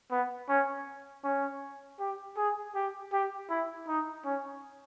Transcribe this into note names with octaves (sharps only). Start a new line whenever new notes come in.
B3
C#4
C#4
G4
G#4
G4
G4
E4
D#4
C#4